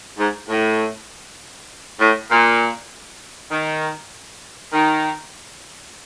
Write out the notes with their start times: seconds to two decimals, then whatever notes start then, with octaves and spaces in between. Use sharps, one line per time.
0.18 G#2
0.48 A2
2.00 A2
2.30 A#2
3.51 D#3
4.73 D#3